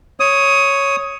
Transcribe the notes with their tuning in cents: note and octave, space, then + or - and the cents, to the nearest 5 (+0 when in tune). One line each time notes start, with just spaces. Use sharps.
C#5 +0 D#6 +15